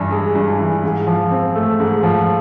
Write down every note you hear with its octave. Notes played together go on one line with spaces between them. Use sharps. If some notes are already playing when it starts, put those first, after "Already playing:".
Already playing: G2 E3
G#3
G2
E3
G#2
F3
C4
A3
G#2
F3